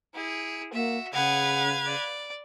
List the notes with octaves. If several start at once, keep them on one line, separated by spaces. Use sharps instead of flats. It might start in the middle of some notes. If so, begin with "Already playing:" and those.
E4 G#4
A#3 F#4 E5
C#3 G#4 B4 F5 F#5 G#6
D5